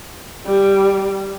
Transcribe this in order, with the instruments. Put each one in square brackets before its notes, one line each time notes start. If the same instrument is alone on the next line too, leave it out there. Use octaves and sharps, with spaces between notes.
[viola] G3